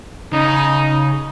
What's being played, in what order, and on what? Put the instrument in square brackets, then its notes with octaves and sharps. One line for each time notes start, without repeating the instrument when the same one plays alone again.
[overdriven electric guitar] C#3 [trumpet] D#4